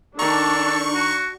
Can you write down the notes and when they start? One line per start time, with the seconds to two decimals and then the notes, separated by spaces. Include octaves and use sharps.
0.19 D#3 D4 A4 A#5 C#6
0.95 F#4